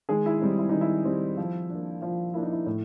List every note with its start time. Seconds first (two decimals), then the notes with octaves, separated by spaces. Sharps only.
0.09 D#3 G#3 G#4
0.26 E4
0.41 G3 C4 D#4
0.58 E4
0.69 D#3 D#4
0.81 E4
1.05 G3 C4
1.37 F3
1.69 D4
1.75 A#3
2.02 F3 F4
2.34 A#3 D4 E4
2.43 D#4
2.52 E4
2.66 A2